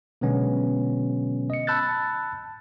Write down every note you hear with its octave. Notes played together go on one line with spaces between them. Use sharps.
B2 D3 F#3 G#3 B3 C#4
D#5 C#7
A5 B5 E6 F#6 G6 A6